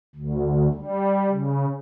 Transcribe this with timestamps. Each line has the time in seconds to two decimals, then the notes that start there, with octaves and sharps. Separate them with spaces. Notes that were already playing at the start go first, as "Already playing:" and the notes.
0.15 D2
0.74 G3
1.30 C#3